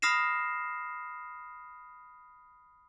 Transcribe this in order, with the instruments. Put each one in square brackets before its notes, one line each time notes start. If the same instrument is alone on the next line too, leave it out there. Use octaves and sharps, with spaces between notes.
[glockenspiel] B5 D#6 F6 A#6 C7 E7